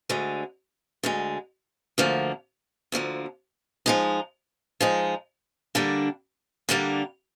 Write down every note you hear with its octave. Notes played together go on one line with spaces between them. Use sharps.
D2 D3 G#3
D2 D3 G#3
D2 D3 F3 A#3
D2 D3 F3 A#3
F3 G#3 D#4
F3 G#3 D#4
D3 G3 A#3 D4
D3 G3 A#3 D4